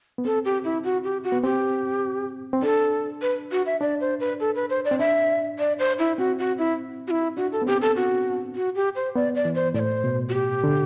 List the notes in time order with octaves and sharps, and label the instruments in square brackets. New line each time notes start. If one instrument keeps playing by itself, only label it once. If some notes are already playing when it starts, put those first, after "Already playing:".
[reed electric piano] B3
[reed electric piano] C4 [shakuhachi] A4
[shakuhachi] G4
E4
F#4
G4
F#4
[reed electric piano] B3
[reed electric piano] C4 [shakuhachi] G4
[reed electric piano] C4
[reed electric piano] D4 [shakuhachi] A4
[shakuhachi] B4
F#4
E5
[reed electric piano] D4 [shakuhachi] D5
[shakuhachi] C5
B4
A4
B4
C5
D5
[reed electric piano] C4
[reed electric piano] D4 [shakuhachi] E5
[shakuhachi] D5
C5
E4
[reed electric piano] C4 [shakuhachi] F#4
[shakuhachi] F#4
E4
F#4
E4
[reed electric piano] D4 [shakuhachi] F#4
[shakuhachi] A4
[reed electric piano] B3
[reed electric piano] C4 [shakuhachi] G4
[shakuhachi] A4
F#4
F#4
G4
C5
[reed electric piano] B3 [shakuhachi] D5
[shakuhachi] D5
[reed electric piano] E3
[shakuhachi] C5
[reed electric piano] A2 [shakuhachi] D5
[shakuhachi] C5
[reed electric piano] B2
[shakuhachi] F#4
G4
[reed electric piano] D3